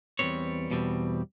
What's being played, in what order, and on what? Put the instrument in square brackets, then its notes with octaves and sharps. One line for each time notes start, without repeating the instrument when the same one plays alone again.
[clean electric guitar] E2 B2 G3 C4 B4 C#5
E2 B2 G3 C4